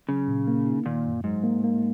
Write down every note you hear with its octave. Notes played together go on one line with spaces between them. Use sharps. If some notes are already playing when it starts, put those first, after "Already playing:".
C#3 F#3
A#2
A#3
D#4
A#2 D#3
F#2
G#2 F#3
A#3
A#3